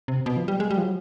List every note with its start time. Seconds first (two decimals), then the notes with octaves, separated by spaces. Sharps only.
0.08 C3
0.26 B2
0.37 F3
0.48 G3
0.60 G#3
0.71 G3
0.78 F3
0.83 F#3